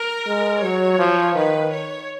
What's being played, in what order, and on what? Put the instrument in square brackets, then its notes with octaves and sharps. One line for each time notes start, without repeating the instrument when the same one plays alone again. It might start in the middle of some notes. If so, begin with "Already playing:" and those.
Already playing: [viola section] A#4
[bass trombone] G#3
[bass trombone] F#3 [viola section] C#5
[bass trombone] F3
[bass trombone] D#3 [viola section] B4
[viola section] C#5